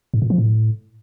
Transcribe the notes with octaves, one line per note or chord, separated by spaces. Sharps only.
G#2
A#2
F3
A2